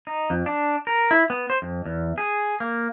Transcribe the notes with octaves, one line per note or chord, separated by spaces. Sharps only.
D#4
F2
D4
A#4
E4
B3
C5
F2
E2
G#4
A#3